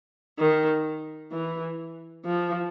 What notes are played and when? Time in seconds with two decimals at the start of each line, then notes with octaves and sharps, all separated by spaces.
0.39 D#3
1.32 E3
2.25 F3